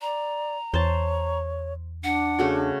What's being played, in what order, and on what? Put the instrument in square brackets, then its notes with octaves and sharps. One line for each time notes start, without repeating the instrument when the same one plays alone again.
[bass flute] D5 [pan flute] A#5
[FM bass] E2 [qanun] C5 A5 [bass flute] C#5
[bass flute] D4 [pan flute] F#5
[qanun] C#3 A3 F#4